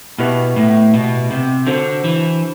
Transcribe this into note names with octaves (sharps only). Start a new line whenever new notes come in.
B2 B3 E4 G4 B4 E5
A2
B2
C3
D3 D4 F#4 C5
E3